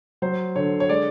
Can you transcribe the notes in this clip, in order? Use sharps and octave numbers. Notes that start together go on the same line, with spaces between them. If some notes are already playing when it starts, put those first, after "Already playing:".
F#3 C5
D3 C#5
C#5
G#3 D5